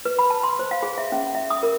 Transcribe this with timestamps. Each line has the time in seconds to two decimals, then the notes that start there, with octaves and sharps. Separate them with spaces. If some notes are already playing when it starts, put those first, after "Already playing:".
0.05 B4
0.19 B5
0.30 A5
0.43 C6
0.59 C5
0.71 F5
0.83 G#4
0.98 E5
1.12 C#4
1.35 E5
1.51 D#6
1.63 A#4